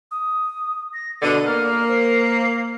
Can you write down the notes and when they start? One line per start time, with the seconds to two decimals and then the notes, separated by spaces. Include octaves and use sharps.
0.11 D#6
0.94 A#6
1.22 B2 D3 D5 D#7
1.46 A#3 F6
1.89 C5 C7